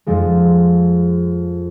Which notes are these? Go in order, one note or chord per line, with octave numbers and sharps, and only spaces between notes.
F2 F3 G#3